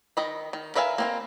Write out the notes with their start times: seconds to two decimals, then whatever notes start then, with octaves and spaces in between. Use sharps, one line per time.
0.17 D#3 D#5 B5
0.53 D#3
0.75 A#4 B4 E5 F5 G#5
0.98 A#3 C4 D#4